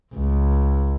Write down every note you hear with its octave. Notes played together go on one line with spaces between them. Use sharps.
C#2